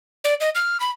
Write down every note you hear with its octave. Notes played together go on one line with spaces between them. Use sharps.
D5
D#5
F6
B5